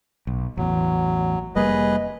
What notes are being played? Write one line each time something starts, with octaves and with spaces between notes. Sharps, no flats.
B1
A1 E2 F#3
F1 G3 A#3 G#4 B4 D#5